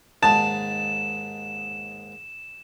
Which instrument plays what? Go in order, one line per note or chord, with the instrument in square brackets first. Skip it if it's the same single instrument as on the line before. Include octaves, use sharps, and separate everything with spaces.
[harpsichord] D#2 G#2 [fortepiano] A5 [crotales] E7